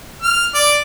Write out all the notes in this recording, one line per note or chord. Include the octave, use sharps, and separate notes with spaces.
F6
D5